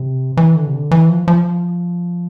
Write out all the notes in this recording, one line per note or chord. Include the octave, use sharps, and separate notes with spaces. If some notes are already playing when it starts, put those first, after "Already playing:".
Already playing: C3
E3
D3
C3
D3
E3
F3
F3